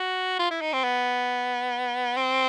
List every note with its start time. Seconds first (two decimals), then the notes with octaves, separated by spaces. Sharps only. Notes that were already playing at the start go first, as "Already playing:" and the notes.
Already playing: F#4
0.39 F4
0.51 E4
0.61 D#4
0.73 C4
0.84 B3
2.17 C4